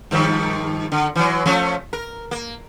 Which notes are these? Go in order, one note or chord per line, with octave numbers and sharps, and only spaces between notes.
G2 D#3 F3
D3
E3 F#3
F3 A3 C#4
A#4
A#3